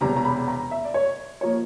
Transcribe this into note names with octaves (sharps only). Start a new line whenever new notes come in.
E1 E2 C3 A#5
A#5
B5
A#5
E5
D5
C#5
F3 A#3 C#5